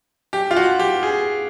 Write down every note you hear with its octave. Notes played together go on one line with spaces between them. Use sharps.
G4
F4
F#4
G4
G#4